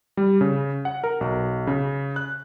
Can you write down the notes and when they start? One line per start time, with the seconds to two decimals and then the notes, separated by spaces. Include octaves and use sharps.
0.17 G3
0.41 C#3
0.85 F#5
1.04 A#4
1.21 B1
1.67 C#3
2.16 F#6